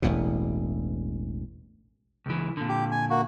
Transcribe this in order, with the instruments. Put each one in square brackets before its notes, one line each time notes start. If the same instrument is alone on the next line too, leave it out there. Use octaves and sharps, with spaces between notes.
[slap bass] E1 A1 E2 B2
[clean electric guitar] C#2 E3
A#2 D3
[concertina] G4
G#5
A#3 F#4